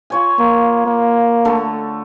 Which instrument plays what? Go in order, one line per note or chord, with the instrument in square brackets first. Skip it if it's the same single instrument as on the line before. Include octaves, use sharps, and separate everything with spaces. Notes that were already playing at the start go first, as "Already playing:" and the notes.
[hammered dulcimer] F4 C#5 G#5
[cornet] A#3
A#3
[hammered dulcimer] D3 A3